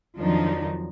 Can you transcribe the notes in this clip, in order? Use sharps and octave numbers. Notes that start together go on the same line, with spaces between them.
F2 D#3 F3 F#3 D4 D#4